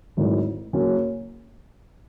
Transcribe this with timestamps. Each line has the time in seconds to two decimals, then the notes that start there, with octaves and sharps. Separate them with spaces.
0.17 G#1 G#2 F#3 A3 E4
0.73 F#1 F#2 C#3 F#3